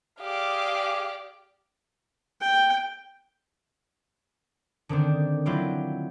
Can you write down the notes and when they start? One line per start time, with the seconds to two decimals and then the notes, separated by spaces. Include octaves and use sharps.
0.21 G4 G#4 D5 F5 D6
2.41 G5
4.89 D3 D#3 C4 D4
5.46 F#3 E4 F4 G4